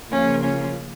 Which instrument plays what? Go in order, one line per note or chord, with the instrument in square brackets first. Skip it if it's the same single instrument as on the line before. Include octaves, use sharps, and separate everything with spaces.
[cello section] C#3 F3 A#3 F4 [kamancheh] C#4
[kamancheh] C#4